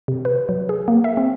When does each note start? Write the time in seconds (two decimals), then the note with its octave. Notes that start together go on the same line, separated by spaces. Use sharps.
0.08 C3
0.25 B4
0.49 F#3
0.69 G#4
0.88 A#3
1.04 E5
1.17 C4